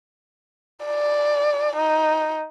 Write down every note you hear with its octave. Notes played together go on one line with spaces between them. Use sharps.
D5
D#4